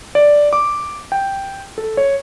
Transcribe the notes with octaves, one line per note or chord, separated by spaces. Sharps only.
D5
D6
G5
A4
C#5